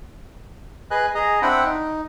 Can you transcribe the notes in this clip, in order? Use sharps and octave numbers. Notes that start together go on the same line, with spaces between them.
G#4 B4 D#5 G#5 F#6
G#4 D#5 A#5
C4 D4 E4 F#5 G5 B5
D#4